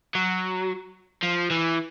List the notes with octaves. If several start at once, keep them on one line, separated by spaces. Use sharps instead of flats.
F#3
F3
E3